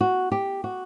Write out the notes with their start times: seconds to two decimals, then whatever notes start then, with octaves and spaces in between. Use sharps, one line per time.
0.01 F#4
0.32 G4
0.64 F#4